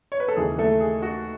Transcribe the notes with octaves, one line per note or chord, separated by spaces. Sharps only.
C#5
B4
A4
D#2 C#3 E3 G#4
A3 A4
G#4
F#4